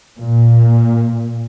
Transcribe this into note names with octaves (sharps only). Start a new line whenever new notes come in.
A#2